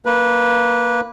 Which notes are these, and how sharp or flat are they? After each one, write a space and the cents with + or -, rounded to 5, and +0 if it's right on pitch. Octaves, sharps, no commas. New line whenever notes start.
A#3 +0 B4 -15